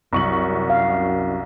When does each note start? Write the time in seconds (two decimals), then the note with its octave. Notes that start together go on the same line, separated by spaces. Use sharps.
0.13 C2 F#2 C#6 F#7
0.70 F5